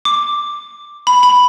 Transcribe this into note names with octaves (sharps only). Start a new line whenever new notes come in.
D6
B5
B5